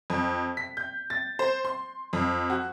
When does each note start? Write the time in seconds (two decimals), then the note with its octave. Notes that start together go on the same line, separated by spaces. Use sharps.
0.10 F2
0.57 B6
0.77 G6
1.10 A6
1.39 C5
1.65 C6
2.13 F2
2.50 F#4